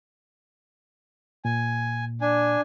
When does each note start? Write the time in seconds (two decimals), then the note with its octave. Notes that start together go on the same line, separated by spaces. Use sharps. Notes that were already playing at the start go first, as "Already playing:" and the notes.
1.45 A#2 G#5
2.21 D4 G#5